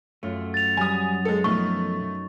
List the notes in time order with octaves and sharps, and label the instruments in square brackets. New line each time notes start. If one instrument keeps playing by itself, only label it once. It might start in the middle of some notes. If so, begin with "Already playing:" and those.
[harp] F#2 [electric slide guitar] A3 F4
[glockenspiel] A6 F7
[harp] F#3 [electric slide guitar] G3 [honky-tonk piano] G#5 D#6
[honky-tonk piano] G#3 A4
[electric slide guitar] B2 D#3 F3 [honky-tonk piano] A3 [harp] D#4 A#4 [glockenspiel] C#6